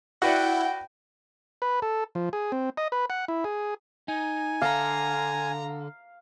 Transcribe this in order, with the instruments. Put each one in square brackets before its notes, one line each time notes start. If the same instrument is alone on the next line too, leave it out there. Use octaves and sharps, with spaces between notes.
[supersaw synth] E4 [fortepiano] F#4 B4 D5 [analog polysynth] F#5 [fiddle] G5
[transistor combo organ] B4
A4
F3
G#4
C4
D#5
B4
F#5
E4
G#4
[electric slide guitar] D#4 [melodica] G#5
[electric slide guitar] D3 A4 [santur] F5 [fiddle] A#5